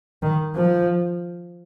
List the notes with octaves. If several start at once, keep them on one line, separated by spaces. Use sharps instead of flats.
D#3
F3